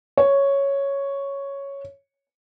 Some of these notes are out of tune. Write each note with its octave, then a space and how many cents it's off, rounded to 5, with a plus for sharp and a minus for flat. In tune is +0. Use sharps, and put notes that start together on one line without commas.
C#5 +0